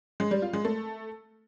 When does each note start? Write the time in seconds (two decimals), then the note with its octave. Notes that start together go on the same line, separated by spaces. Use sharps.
0.20 G#3
0.31 G3
0.42 F4
0.53 G#3
0.65 A3